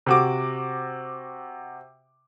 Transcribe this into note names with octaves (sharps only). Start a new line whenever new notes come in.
C3 F#4 D6